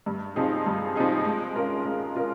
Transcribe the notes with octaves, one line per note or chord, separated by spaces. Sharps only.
G2
F3 C4 D#4 G#4
G2
F3 C4 D#4 G#4
G#3
C#4 F4 A#4
G#3
C#4 F4 A#4